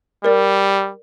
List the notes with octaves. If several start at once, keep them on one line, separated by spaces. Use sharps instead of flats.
G3 A#4 D5